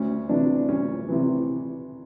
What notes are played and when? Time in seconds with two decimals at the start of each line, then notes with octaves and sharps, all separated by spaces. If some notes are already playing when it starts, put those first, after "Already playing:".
Already playing: D2 C#4
0.29 C3 E3 D4
0.69 D2 C#4
1.09 C3 E3